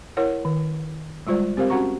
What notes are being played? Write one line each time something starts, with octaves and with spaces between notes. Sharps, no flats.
E4 A#4 C#5 F#5
D#3
G3 G#3 F4 C5 D5
C4 G4 A#4 C5 F5
C#4 F#4 F#5 A#5 C#6